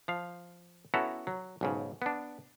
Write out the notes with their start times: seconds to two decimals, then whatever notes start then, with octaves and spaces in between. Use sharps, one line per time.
0.08 F3 F5
0.94 B3 C#4 E4 F#4 A4 A#5
1.27 F#3
1.61 B1 G#2 C#3
2.02 B3 D4